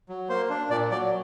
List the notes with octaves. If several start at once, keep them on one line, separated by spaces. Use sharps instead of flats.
F#3
A#3 C5
D4
A#2 D5
F#3 D5